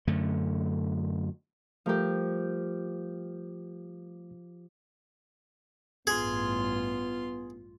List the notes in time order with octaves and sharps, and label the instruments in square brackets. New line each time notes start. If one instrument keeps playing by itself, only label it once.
[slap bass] F#2 D3 A3
[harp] F3 G4 [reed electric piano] G3 A3 A#4
[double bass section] A1 G2 [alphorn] B3 [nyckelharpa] F4 C6 [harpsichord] G#4